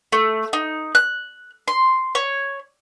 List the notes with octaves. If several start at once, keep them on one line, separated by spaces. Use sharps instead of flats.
A3
D#4
F#6
C6
C#5